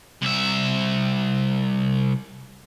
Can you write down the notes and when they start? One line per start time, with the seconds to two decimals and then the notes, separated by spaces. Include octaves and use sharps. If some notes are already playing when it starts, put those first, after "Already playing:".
0.22 C2 E5